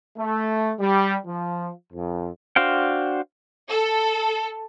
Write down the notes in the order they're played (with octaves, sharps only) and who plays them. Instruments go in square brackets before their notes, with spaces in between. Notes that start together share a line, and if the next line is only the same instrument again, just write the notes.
[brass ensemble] A3
G3
F3
F2
[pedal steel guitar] D4 F#4 C5 F5 G5
[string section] A4